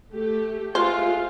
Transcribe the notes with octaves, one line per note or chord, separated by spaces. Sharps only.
A3 G4
G#3 E4 F4 C5 F5